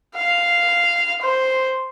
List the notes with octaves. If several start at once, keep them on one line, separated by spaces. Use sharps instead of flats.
F5
C5